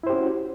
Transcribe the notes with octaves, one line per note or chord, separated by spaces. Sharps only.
C#4 E4 F#4 G4 C5